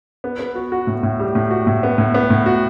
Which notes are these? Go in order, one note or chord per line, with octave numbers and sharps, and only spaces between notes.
B3
B3
F#4
F#4
A2
A2
G3
A2
F#4
A2
B3
A2
B3
A2
F#4